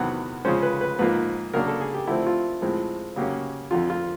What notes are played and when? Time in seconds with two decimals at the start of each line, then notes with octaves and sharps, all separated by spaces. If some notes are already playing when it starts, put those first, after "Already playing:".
Already playing: E2 C3 D#3 F#3 B3 F#5
0.45 C#3 F3 G#3 C#4 C5
0.62 B4
0.81 B4
0.99 G#2 F3 A#3 B4
1.54 C#3 F#3 A#3 D4 A#4
1.67 A4
1.81 G#4
1.94 G4
2.07 D3 F3 A3 C4 E4
2.27 F4
2.62 A2 F3 G#3 C4
3.16 C#3 F#3 A#3 C#4 G4
3.71 F2 D3 F3 F4
3.90 F4